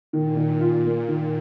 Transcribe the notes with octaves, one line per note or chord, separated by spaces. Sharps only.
A#2 D#3
D#3
F4
A#3
D#3